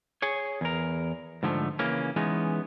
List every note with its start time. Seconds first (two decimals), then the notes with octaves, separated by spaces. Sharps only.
0.22 G#4 C#5
0.61 E2 A#4
1.43 G#2 D3 F3 G#3 A3
1.79 C#3 E3 A#3 C#4
2.16 E3 G#3 B3 C#4 D#4